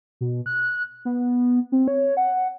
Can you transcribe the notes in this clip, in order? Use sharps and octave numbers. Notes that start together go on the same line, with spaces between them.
B2
F#6
B3
C4
C#5
F#5